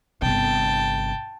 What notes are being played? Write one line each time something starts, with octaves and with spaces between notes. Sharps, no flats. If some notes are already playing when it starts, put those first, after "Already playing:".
G1 C3 G5 A5